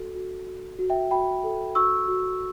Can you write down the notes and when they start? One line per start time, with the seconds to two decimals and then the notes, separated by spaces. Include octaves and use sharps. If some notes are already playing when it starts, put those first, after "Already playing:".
Already playing: F#4 A4
0.15 F#4
0.47 F#4
0.79 F#4
0.90 E5 G5
1.11 F#4 G5 B5
1.43 A4
1.75 F#4 C#6 E6
2.08 F#4